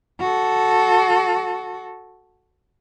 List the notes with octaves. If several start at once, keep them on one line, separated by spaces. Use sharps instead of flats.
F#4 A4